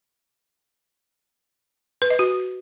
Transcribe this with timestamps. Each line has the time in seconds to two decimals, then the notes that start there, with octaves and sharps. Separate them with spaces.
2.02 B4
2.10 D#5
2.19 F#4